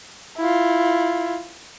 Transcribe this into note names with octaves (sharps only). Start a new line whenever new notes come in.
E4 F4